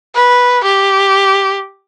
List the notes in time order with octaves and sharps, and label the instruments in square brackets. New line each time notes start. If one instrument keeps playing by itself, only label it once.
[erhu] B4
G4